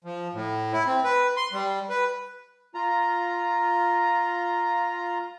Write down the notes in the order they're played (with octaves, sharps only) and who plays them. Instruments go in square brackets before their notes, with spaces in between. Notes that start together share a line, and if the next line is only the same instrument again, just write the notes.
[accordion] F3
A2
E4
C4
B4
C6
G3
B4
F4 A#5